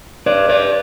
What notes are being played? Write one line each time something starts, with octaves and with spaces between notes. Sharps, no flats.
B4 D5
B4 D5